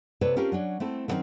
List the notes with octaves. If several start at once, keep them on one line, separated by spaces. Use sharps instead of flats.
C3 A4 B4 C#5 D5
C4 C#4 F4 G4 A4 A#4
F#3 C#4 D4
A3 C4 E4 A4
D3 D#3 F#3 G3 C4 C#4